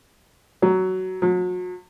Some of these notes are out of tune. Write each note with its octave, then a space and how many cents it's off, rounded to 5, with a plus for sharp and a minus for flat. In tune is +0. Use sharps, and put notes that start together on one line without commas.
F#3 +15
F#3 -35